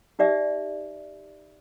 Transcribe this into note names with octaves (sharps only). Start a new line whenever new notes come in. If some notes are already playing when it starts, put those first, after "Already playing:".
D#4 G4 D5 E5